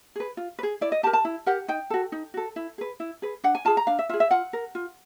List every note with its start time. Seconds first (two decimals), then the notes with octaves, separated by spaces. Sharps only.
0.16 G#4 B4
0.37 F4
0.59 B4
0.63 G#4
0.81 E4 D5
0.92 D#5
1.03 G4 A5
1.07 A#4
1.13 A5
1.25 E4
1.46 G4 A#4 F#5
1.68 D#4 G5
1.90 F#4 A4
2.12 D#4
2.34 F#4 A4
2.56 E4
2.78 G#4 B4
3.00 E4
3.22 G#4 B4
3.44 D4 F#5
3.55 G#5
3.65 F4 G#4 A5
3.77 A#5
3.87 D4 F5
3.99 E5
4.09 F4 E5
4.14 G#4
4.20 E5
4.31 F4 F#5
4.53 A#4
4.75 F4